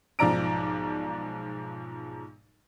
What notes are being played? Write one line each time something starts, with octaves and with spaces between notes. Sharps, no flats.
B1 G#2 F3 D5 A#5 D7